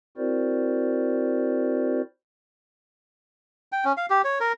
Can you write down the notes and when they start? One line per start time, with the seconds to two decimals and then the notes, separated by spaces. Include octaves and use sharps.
0.17 C4 E4 F#4 A#4 C5 D5
3.72 G5
3.85 C#4
3.97 F5
4.10 G4
4.24 C#5
4.40 A#4